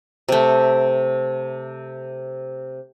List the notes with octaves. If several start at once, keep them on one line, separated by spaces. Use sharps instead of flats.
C3 A3